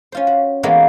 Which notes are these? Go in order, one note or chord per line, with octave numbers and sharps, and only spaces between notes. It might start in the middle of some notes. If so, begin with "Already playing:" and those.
C#4 F4 C5
F#4
E3 G#3 A#3 B3 F4 F#4